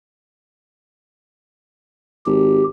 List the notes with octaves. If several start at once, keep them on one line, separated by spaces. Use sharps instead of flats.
G#1 G4